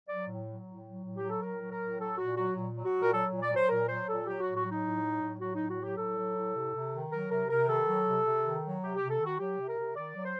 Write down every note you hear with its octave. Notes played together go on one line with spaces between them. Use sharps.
F#3 D5
A2
F#3
A2
F#3
A2
F#3 G4
A4
A2 A#4
F#3
A#4
A2
F#3 A4
A#2 F#4
F#3 F#4
A#2
F#3
F#4
A#2
A#4
F#3 A4
A#2
D5
F#3
C5
A#2 A#4
F#3 C5
A#2 A4
F#3 G4
F#4
A2
F#4
F#3 D#4
A2
F#3
A2
F#3 F#4
A2 D#4
F#4
F#3 G4
A2 A4
F#3
A2
C3
C3
D#3
F#3 A#4
C3 A#4
C3 A#4
D#3 A4
F#3
C3
C3
D#3
F#3
C3 G4
G4
C3
A4
D#3
F#4
F#3 G4
C3
A#4
C3
D#3 D5
F#3
C5